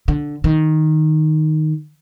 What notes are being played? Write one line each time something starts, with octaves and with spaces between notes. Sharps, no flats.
D3
D#3